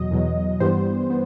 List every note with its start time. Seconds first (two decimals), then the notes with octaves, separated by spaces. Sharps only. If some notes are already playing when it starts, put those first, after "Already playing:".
Already playing: E2 B2 F#3 D#5
0.11 E2 B2 F#3
0.60 G2 E3 G3 B3 C5
1.10 B3